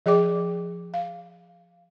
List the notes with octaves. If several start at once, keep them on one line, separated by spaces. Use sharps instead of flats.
F3 G#4 D5 G5 D6
F5